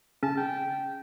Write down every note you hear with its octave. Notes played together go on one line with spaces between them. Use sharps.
C#3 A5
G5